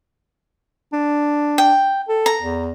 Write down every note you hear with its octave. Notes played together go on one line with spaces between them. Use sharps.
D4
G5
A4
A#5
E2